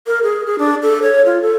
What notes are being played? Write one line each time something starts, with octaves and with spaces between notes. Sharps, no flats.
A#4
G#4
G#4
D4
A4
C#5
F4
A4